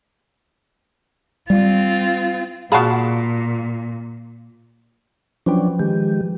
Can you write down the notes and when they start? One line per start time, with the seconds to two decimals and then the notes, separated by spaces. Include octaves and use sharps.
1.50 G3 C4 F4
2.72 A#2 F#4 G#4 F5 A5 B5
5.46 F3 F#3 C#4 D4 B4 G5
5.79 D#3 G#3 G4